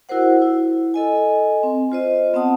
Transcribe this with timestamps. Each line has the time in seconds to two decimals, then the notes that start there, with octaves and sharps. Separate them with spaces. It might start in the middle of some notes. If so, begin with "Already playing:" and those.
0.09 E4 F#4 A#4 C5 F#5
0.42 E4
0.94 A4 D#5 G#5
1.63 C4
1.92 F4 C5 D#5
2.33 B3 C4 F#5 A5 D#6